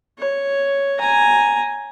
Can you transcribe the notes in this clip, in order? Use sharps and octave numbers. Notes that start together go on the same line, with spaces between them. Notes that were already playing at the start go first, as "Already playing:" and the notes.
C#5
G#5 A#5